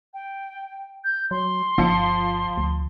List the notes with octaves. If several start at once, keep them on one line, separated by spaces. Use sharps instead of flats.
G5
G6
F#3 C6
G1 F3 C#7
D2